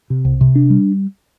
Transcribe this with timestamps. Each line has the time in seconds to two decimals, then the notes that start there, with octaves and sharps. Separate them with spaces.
0.10 C3
0.25 C2
0.41 C3
0.55 D4
0.70 G3